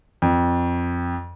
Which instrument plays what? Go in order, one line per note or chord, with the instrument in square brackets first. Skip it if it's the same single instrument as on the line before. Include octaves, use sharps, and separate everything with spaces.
[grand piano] F2